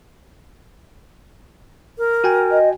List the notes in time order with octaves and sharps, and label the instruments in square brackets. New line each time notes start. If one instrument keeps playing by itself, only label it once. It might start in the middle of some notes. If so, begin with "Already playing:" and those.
[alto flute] A#4
[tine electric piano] F#4 G5 G#5
[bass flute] D#5